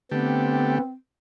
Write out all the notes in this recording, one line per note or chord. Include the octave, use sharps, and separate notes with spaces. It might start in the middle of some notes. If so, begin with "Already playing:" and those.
D3 A3 B3 C4 G4